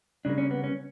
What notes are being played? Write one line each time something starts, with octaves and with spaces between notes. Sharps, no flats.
C#3 G3 A#3 D4
C#4
B3
C#4